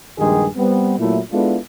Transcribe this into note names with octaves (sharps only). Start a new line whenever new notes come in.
A#1 G2 D#3 G#3 G4 G#4
G3 B3 C4
A#2 F#3 A3 E4
G#3 B3 D4 E4 F4 A4